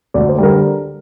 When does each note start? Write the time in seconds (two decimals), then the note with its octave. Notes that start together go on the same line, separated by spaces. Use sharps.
0.14 D2 D5
0.29 C5
0.38 D3 G3 A#4